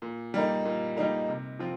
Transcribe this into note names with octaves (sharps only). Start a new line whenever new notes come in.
A#2
G3 A#3 D#4 A#4
A#2
G3 A#3 D#4 A#4
C3
F3 C4 F4